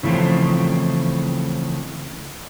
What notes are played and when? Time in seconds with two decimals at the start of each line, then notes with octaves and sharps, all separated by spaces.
0.03 C#3 E3 F3 A3 C4